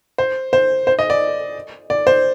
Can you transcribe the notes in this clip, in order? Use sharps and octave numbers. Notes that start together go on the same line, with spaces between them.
C5
C5
C5
D#5
D5
D5
C5